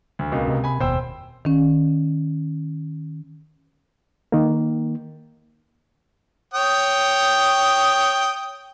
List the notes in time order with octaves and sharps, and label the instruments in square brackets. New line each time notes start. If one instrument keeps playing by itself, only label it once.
[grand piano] D2
C#2 B2 A#3
[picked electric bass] C3
[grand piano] G#5 B5
[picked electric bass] F1 D#2 B2 [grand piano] C5 G5 E6
[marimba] D#3 C#4
[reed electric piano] D#3 A#3
[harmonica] C#5 G5 D#6